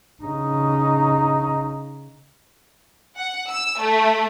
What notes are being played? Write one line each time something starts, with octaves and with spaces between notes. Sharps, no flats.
C#3 D#4
F#5
E6
A3